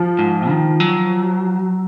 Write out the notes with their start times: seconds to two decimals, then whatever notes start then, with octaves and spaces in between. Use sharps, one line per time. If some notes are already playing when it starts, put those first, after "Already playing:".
Already playing: F3
0.19 G#2
0.49 D#3
0.80 F#3